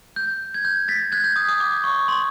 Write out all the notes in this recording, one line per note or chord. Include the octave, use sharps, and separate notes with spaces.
G6
G#6
G6
A6 B6
F#6 G#6
G6
D#6
D#6
D6
C#6
C6